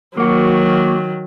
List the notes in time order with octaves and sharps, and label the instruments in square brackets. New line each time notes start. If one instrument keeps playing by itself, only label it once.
[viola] D#3 F#3 [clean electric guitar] A#3 F#4